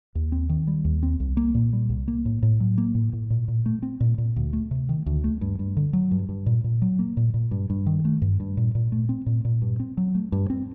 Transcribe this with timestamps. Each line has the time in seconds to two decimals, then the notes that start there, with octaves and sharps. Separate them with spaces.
0.15 D#2
0.32 C4
0.49 D#3
0.67 G3
0.85 D#2
1.03 C4
1.20 C2
1.37 A#3
1.55 A#2
1.73 G3
1.90 C2
2.08 A#3
2.25 A2
2.43 A2
2.60 F#3
2.78 A#3
2.95 A2
3.13 A2
3.30 A#2
3.48 A#2
3.66 A3
3.83 C4
4.00 A#2
4.18 A#2
4.36 D2
4.53 A3
4.71 C3
4.89 D#3
5.06 D2
5.24 A3
5.41 G2
5.59 G2
5.77 D3
5.93 F#3
6.11 G2
6.29 G2
6.46 A#2
6.64 A#2
6.82 F#3
6.99 A#3
7.17 A#2
7.34 A#2
7.51 G2
7.70 G2
7.87 D#3
8.05 A3
8.22 G2
8.40 G2
8.57 A#2
8.75 A#2
8.92 A3
9.09 C4
9.26 A#2
9.45 A#2
9.62 G2
9.80 C4
9.97 F#3
10.15 A3
10.32 G2
10.50 C4